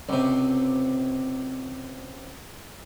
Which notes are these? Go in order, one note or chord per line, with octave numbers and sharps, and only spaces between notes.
C#2 C3